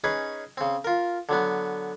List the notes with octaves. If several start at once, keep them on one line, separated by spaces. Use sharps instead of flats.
C#4 D#4 G#4 B4
C#3 C4
F4 A#4
D3 F#3 B3